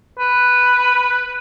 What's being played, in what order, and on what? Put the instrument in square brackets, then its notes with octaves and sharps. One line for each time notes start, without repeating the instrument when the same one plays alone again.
[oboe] B4